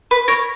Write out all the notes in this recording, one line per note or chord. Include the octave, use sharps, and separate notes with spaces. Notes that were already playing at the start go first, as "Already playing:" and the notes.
B4
A#4 C#5